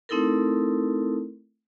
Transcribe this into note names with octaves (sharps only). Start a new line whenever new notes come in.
A3 C4 D#4 E4 A4 A#4